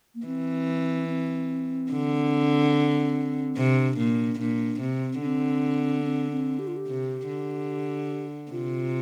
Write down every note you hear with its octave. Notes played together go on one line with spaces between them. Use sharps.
A#3
E3 C4
C4
D3
C3 D4
A#2
A#2 D4
C3 C4
D3 C4 D4
C4
C4
G4
F4
G4
C3
D3
C3 F4